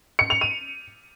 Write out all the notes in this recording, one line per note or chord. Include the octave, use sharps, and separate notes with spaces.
C#7
F7
D#7